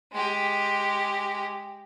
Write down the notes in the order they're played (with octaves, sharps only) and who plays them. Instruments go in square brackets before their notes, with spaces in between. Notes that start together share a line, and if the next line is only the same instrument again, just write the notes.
[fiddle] G#3 G4